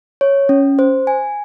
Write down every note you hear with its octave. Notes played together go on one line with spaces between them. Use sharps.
C#5
C#4
C5
G#5